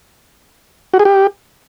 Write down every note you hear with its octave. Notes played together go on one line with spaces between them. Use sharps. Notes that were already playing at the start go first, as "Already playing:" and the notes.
F#4
G#4
G4